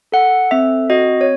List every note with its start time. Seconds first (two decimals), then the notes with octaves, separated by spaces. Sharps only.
0.12 A4 F#5
0.51 C4 E5
0.90 F#4 D#5
1.21 C#5